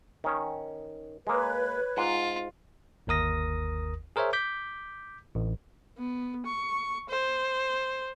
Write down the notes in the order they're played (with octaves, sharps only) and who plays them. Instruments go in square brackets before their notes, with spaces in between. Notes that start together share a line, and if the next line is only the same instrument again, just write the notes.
[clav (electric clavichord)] D#3 C#4
[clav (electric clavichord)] G#3 A#3 [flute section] B4 C#5
[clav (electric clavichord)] G#2 F#5 [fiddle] F4
[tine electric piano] G1 D#2 A#4 D#6 A#6
G#4 A#4 C5 C#5 E5
D6 G6 B6
A1
[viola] B3
C#6
C5